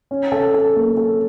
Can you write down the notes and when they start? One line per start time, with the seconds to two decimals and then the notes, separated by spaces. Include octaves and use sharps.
0.11 C#4
0.32 A4
0.54 A4
0.76 A#3
0.97 A4